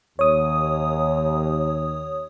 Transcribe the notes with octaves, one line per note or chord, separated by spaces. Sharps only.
D#2 C#5 D#6